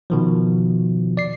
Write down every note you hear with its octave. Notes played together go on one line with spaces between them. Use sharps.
B2 D#3 F3
D5 C7